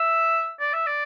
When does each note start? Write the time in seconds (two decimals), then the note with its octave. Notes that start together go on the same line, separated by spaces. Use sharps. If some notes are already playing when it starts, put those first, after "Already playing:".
Already playing: E5
0.60 D5
0.73 E5
0.86 D5